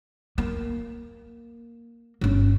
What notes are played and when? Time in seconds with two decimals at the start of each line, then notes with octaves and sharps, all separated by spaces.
0.38 A#3
2.21 G1 C#4